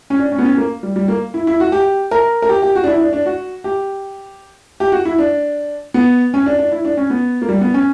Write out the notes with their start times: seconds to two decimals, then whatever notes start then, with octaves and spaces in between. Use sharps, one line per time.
0.10 C#4
0.19 D4
0.32 C#4
0.38 B3
0.45 C#4
0.57 A#3
0.83 G3
0.96 G3
1.08 A#3
1.34 E4
1.47 E4
1.60 F#4
1.72 G4
2.11 A#4
2.42 A#4
2.49 G4
2.62 G4
2.75 F#4
2.84 D4
2.87 E4
3.00 D4
3.13 D4
3.26 F#4
3.64 G4
4.80 G4
4.92 F#4
5.05 E4
5.19 D4
5.94 B3
6.34 C#4
6.46 D4
6.59 D4
6.72 E4
6.85 D4
6.97 C#4
7.10 B3
7.42 A#3
7.49 G3
7.61 B3
7.74 C#4